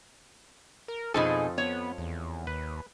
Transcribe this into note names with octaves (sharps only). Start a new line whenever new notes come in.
A#4
F2 B2 F3 D#4 G#4 A4 G#5
B3 C#5
E2
D#2 B4